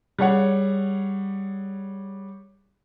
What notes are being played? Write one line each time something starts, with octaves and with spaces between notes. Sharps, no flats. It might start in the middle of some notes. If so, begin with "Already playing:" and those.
G3 G#4 C#5 F#5